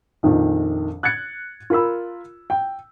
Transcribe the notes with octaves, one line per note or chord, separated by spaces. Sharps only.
A#1 F2 D#3
F#6 G#6 A6 C#7
F4 A#4 B5 E6
G5